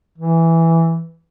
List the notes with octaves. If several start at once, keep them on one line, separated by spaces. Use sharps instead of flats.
E3